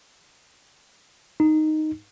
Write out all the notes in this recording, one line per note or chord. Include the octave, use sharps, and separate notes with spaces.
D#4